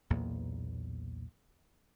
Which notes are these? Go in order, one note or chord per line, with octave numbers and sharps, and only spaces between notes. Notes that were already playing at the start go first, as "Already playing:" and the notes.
B1 E2 A#2 A#3